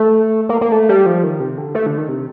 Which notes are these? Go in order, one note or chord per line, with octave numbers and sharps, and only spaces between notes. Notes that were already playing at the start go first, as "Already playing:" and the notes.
Already playing: A3
A#3
A#3
A3
G3
F3
D#3
C3
D3
A3
D3
D#3
C3